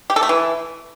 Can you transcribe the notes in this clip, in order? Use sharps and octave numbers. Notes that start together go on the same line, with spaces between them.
G4
A4
A3
E3